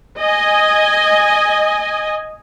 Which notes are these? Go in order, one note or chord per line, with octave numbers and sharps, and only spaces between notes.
D#5 G#5